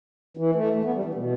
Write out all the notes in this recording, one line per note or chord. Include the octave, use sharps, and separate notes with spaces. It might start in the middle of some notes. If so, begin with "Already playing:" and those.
E3
A3
A3
B3
G3
E3
B2